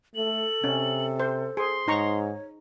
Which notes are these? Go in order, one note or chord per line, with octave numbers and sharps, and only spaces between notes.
A3 A4 F#7
C3 C#4
C5
G#4 C5 C6
G#2 D#4 C#5 A#5 C#6